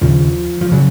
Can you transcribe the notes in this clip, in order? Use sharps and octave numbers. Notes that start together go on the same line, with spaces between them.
D#2 C#3 F3
F3
C#3 F#3